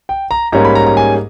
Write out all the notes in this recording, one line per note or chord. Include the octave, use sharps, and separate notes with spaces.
G5
A#5
G#2 G3 A#3 C#4 A#5
B5
A#5
A#5
G#5